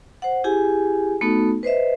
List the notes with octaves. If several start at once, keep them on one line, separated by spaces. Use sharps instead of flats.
C5 F#5
E4 G4 G#4 G#5
A3 B3 D#4 F#4 A4
B4 C5 D#5 E5